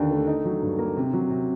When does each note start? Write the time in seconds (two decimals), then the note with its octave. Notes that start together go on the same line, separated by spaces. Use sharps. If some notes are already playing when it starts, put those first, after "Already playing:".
Already playing: D#2 D3 D4
0.11 A3
0.27 D#4
0.45 F#3
0.62 G2
0.79 A#3
0.97 C3
1.13 F#3
1.30 C3